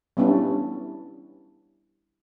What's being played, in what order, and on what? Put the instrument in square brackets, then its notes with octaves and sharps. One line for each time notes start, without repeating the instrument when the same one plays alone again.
[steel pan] G3 B3 C#4 D4 E4